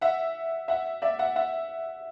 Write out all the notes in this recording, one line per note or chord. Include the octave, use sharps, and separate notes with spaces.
E5 F#5
E5 F#5
D5 E5
E5 F#5
E5 F#5